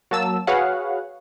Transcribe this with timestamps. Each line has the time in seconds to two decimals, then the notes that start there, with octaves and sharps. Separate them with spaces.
0.11 F#3 A#3 A5 E6
0.47 F#4 G#4 B4 C#5 F5 F#5